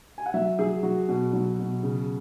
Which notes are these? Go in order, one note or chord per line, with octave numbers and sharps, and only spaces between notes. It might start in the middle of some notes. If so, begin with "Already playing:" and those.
G#5
F#5
F#3 E5
F#3 G#4
F#3 F#4
B2
F#3
B2
C#3